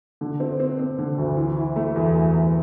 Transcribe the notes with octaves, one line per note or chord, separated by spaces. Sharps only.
D3
C4
C4
C4
D3
D2
E3
E4
A3
E2
E2
E2